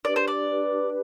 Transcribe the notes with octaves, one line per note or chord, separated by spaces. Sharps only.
D4 G4 B4 D5
C5
D5